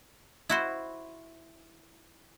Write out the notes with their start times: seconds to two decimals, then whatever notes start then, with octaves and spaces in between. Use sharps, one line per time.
0.49 E4 F#4 C5